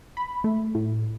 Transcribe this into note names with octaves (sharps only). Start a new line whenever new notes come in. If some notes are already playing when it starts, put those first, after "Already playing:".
B5
A3
A2